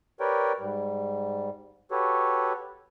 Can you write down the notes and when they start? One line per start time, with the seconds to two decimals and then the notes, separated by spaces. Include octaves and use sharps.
0.20 G4 A#4 B4 C#5 D5 G5
0.60 G#2 G3
1.91 F#4 G4 A4 B4 C#5